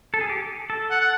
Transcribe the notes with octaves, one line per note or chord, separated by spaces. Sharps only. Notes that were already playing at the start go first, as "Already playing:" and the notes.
A4
G#4
G4
A4
F#5
F#5